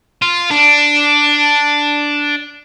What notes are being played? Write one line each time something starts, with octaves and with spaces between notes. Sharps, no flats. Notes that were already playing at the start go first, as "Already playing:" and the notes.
F4
D4